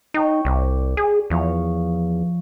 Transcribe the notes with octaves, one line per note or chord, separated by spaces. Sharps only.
D#4 C#5 G5 A#6
C2 D5
G#4
E2 F3 C#5 F5